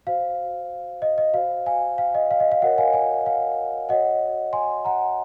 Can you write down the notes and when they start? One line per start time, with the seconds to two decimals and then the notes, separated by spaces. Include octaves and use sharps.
0.07 F#4 C5 F5
1.02 D#5
1.18 D#5
1.34 F#4 C5 F5
1.66 F5 G#5
1.98 F5
2.15 D#5
2.31 F5
2.40 D#5
2.52 F5
2.62 F#4 A#4 C#5 D#5 F#5
2.78 F5 G#5
2.93 F5 G#5
3.26 F5
3.89 F#4 C#5 D#5 F#5
4.53 G#5 C6
4.85 F#5 A#5